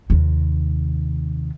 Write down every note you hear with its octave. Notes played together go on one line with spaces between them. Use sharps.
D#2 C3